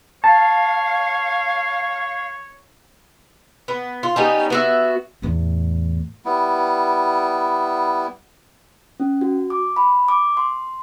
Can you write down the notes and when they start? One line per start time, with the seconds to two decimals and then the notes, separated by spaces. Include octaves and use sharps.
0.24 C#5 F5 A5
3.68 B3
4.03 F4
4.16 G3 B3 C#4 D#4
4.50 B3 F#4 E5
5.22 E2 A2
6.25 G3 B3 E4
9.00 C#4
9.21 F#4
9.50 D6
9.76 B5
10.08 D6
10.37 C6